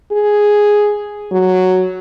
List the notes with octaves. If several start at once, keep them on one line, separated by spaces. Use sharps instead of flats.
G#4
F#3